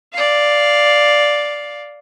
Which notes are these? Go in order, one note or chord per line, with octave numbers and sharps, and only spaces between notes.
D5 F5